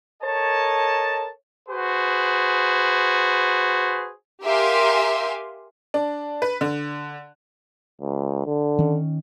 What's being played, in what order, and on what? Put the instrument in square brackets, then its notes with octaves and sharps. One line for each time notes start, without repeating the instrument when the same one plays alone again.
[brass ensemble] A4 A#4 C#5 D#5 A5
[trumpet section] F#4 G#4 B4 C5
[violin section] G4 A#4 E5 F5 G#5 C6
[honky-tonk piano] D4
B4
D3
[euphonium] C#2
D3
[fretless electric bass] D#3 C#4